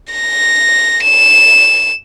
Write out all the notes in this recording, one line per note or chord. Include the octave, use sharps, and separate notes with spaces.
A#6
E7